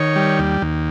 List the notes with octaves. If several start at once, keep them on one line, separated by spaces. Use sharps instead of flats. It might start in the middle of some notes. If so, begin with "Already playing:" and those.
Already playing: D#3 C#5
G3
D#2
D#2